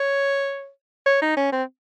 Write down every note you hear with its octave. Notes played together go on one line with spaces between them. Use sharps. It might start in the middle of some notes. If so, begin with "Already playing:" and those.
Already playing: C#5
C#5
D#4
C#4
C4